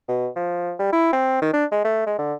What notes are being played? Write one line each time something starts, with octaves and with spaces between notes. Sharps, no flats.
B2
F3
G3
E4
C4
D#3
D4
G#3
A3
G#3
D3